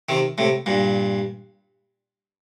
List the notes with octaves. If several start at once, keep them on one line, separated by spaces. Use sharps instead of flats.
C3 D#3
A2 C3
G2 A#2